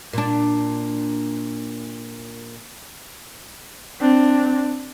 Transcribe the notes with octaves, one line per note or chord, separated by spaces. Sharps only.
A#2 D4
C4 D4